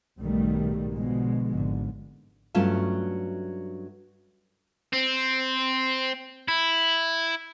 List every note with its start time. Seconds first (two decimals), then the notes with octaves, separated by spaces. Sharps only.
0.19 B1 G#2 D#3 G3 A3
0.93 B2 D3 F3 G#3
1.53 G#1 D3
2.55 G2 F#3 A3 C#4 F4 A5
4.93 C4
6.48 E4